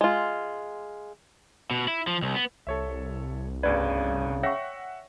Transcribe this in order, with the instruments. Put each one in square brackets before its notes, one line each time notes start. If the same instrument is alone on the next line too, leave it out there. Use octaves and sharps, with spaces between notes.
[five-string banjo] G#3 F4
[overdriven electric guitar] B2
E4
F3
C2
B3
[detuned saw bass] C2 [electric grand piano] A4 C#5 E5
[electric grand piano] G1 D2 B4 [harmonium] C#3 [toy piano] D5
[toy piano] C#5 G5 C#6 [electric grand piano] E5 F#5 A#6